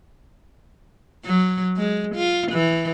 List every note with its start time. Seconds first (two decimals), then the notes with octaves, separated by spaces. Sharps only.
1.25 F#3
1.76 G#3
2.15 F4
2.52 E3